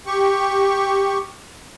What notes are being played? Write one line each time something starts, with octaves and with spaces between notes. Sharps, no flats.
G4 C#6